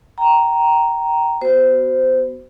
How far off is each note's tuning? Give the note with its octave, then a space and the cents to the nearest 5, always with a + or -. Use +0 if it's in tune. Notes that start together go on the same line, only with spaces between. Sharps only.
G5 -20 A#5 +0
B3 +15 F#4 +20 C5 -15